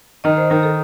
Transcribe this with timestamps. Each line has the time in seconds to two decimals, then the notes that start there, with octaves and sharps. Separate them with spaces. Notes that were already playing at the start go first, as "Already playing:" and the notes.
0.24 D#3 D#5
0.37 C5
0.50 D#3 A#4
0.63 A4